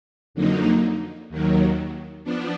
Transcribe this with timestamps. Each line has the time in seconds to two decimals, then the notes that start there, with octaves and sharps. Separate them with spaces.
0.34 F2 D3 F#3 A#3 D#4
1.29 D#2 D#3 F#3
2.24 F3 B3 D4